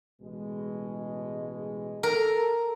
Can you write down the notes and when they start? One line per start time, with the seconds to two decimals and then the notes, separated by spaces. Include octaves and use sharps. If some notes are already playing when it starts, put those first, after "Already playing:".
0.22 A1 B2 G#3
2.03 A4 A#4